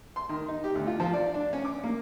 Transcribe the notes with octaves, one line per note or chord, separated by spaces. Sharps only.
C6
D#3
D#4
G4
D2
F4
F3
D5
D4
C#4
D6
A#3